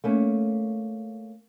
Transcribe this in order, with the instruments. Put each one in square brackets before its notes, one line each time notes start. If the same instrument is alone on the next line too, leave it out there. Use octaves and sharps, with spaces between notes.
[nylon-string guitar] A3 A#3 C#4